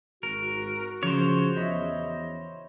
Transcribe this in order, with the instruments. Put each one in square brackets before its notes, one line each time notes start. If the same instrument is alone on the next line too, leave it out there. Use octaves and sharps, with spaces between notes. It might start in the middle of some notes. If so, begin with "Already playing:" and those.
[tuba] G#1 [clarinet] F#4 [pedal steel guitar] A#4
[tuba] C#3 [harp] F3 [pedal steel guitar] C5 C#5
[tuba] E2 [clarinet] D#5 [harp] E5 B5